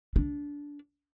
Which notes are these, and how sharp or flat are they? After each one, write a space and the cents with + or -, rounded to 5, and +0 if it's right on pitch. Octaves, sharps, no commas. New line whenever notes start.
D4 -20